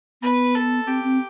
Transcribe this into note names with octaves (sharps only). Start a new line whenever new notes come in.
B3 B4
A4
C4 G4
C4